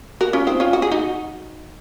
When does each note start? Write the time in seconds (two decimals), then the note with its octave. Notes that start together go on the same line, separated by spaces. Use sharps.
0.21 F#4 A#4
0.33 C#4 F4
0.47 C4 D#4
0.60 C#4 F4
0.73 F#4
0.82 G#4
0.92 D#4 F#4